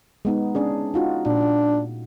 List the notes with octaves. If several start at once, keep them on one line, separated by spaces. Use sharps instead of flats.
G#3 B3 D#4
C#4 D4 G#4
D#4 F4 F#4
A#2 D4